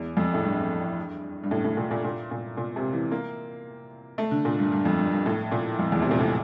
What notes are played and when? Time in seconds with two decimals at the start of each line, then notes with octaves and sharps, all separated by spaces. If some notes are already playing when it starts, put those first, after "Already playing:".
Already playing: E2
0.17 F2
0.34 A2
0.44 G2
1.43 G2
1.51 A2
1.64 A2
1.77 A#2
1.91 A#2
2.04 A#2
2.31 A#2
2.57 A#2
2.76 C3
2.93 E3
3.11 A#3
4.18 A3
4.31 D3
4.45 A#2
4.59 G2
4.72 G2
4.85 F2
4.99 G2
5.12 G2
5.26 A2
5.51 A#2
5.79 F2
5.92 E2
6.02 C3
6.11 A#2
6.20 A2